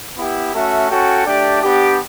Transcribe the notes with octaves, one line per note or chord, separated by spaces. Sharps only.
B3 E4 G4
A3 C#4 F#4 A4 E5
C#4 F#4 A4 C#5 G5
A3 D4 G4 D5 G5
B3 D4 G4